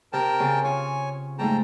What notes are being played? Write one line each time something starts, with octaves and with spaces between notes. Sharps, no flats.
C3 A#4 G5 A5
C#3 C4 G#5
F4 C#5 G#5
F2 G#2 A3 G5 A5 A#5